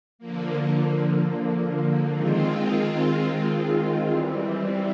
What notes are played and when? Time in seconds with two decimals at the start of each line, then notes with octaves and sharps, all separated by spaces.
0.19 D3 F3 A#3
2.12 D#3 G#3 C4 F4
4.05 E3 G3 C4